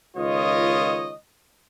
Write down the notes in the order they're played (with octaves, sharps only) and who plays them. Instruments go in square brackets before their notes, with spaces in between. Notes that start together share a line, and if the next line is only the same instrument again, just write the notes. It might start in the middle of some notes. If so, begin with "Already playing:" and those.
[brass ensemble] C#2 D#3 F4 C#5 D#5